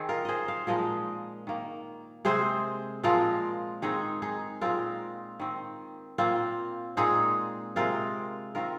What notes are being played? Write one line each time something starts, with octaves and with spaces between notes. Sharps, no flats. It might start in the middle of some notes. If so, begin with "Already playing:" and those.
Already playing: D#3 C4 D#4 G#4
F4 A#4
G#4 C5 D#5
C5 F5
A#2 F3 G#3 A#4 D#5
D#3 A#3
C3 G#3 C4 G#4 C5
A#2 F3 G#3 C4 F4 A#4
D#3 G#3 C4 D#4 G#4
D#4 G#4
A#2 G#3 C4 F4 A#4
D#3 C4
A#2 A#3 C4 F4
A#2 G#3 C4 D#4 G#4
C3 G#3 C4 F4 A#4
D#3 C4 F4 A#4